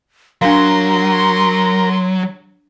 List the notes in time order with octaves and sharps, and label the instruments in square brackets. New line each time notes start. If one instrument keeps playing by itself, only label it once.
[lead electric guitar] F#3 [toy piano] D4 F5 [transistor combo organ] A#4 [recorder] C6